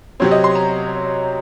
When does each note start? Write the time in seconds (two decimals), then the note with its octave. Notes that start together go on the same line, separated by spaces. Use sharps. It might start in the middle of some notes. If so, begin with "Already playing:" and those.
0.20 C3 F#3 C4 C#5
0.31 D#5
0.44 C6
0.55 A#5